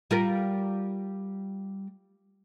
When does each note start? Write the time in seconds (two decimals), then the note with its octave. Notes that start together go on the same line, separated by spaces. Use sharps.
0.11 G3 F4 A#4